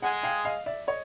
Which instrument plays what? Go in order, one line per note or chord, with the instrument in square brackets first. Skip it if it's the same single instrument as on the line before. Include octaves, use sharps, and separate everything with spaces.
[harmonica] G#3 G#4 [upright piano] F#5 G#5
[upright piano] F5 G5
D#5 F5
D5 E5
C#5 D#5